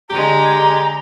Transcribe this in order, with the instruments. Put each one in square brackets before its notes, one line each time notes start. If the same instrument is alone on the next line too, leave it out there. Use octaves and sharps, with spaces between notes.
[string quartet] D3 G#3 [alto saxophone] G4 [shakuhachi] A#5